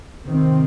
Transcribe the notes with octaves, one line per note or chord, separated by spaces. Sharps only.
C3 D#3 C4